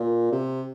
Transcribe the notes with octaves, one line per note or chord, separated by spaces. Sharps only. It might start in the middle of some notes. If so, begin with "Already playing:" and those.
Already playing: A#2
C3